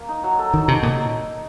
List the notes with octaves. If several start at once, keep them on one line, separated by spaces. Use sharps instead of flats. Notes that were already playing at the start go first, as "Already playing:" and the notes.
Already playing: A#3
D#4
F#3
A4
D#3 D#4
C3 F#3
A#2 D#4